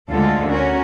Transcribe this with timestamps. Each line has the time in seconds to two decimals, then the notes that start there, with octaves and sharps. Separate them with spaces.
0.12 D2 D3 G#3 F4 A4
0.51 C#4 F#4 A#4